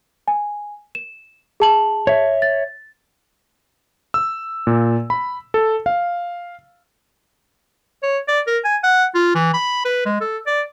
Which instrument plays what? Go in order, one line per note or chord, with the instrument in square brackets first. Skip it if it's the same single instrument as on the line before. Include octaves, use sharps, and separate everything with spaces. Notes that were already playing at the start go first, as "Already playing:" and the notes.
[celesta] G#5
E7
G#4 A5 F#7
[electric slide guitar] C#5 E5
[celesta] A6
[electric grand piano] E6
A#2
B5
A4
F5
[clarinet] C#5
D5
A#4
G#5
F#5
F4
E3
B5
B4
G#3
A4
D5